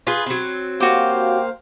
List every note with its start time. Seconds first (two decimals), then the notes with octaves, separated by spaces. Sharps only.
0.07 F4 G#4 B4
0.26 F#3 C4
0.80 A#3 F#4 G4 C5 F5